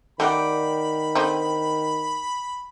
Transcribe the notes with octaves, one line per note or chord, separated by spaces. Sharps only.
D#3 A3 D#4 G4 D5 F#5 G5 B5
D3 C4 D#4